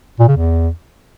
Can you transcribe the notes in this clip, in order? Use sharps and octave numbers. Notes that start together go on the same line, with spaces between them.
A#2
C#3
E2